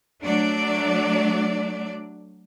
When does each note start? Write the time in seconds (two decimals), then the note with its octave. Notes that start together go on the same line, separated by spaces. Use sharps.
0.23 F#3 A3 D4 D5